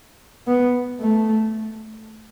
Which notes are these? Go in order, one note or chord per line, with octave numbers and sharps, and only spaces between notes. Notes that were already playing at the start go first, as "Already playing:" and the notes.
B3
A3